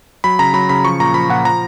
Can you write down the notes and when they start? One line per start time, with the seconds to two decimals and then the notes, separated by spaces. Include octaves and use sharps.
0.24 F#3 B5
0.39 C#3 A#5
0.54 F#3 B5
0.69 C#3 B5
0.85 F3 C#6
1.00 A#2 A#5
1.14 F3 B5
1.29 A#2 F#5
1.45 F3 A#5